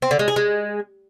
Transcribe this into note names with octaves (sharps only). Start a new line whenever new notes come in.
C4
D3
G#3
G#4
G#3